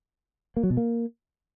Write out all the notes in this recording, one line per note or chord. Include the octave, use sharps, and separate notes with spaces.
A#3
F#3
B2
A#3